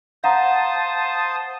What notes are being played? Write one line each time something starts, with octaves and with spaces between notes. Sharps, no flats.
C5 F5 F#5 A5 A#5 D#6